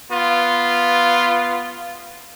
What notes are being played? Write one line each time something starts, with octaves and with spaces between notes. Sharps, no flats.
B3 F4